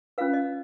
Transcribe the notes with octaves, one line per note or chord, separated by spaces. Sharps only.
C#4 F4 B4 F5
D#5